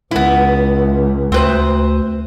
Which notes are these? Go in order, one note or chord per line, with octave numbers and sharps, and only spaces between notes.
C#2 B3 E4
D2 C4 B4 C5